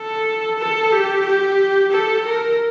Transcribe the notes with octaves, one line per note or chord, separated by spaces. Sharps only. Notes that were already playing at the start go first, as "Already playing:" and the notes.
Already playing: A4
A4
G4
G4
A4
A#4